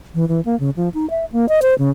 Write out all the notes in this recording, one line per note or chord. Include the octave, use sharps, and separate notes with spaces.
E3
E3
A#3
C#3
F3
D#4
E5
A#3
D#5
C5
C#3